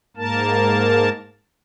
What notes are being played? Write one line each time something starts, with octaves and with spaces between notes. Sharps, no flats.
G#2 A#3 A#4 A5